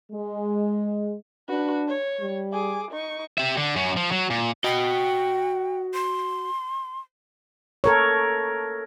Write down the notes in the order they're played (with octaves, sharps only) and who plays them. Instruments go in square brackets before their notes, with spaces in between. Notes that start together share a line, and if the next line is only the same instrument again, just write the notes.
[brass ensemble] G#3
[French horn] D4 [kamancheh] F#4 B4
[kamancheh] C#5
[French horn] G3
[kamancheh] G#4 D6
D#4 C#6
[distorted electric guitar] G4 E5
D3
F#2 C#4
F3
F#3
A#2
[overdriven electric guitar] F#4 D#5 [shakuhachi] G5
[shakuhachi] C6
[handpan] A4 A#4 C#5